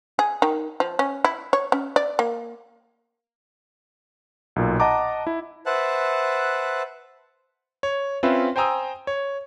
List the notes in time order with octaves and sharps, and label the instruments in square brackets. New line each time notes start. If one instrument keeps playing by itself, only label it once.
[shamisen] G#4
D#3
F3
C#4
E4
C#5
C#4
D5
A#3
[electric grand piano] B1 A#2
D#5 F#5 A5 A#5 D6
E4
[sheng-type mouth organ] B4 C5 E5 F#5 A5 F#6
[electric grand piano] C#5
C4 C#4 F4 B4 E5
C5 G5 G#5 A#5 D#6 E6
C#5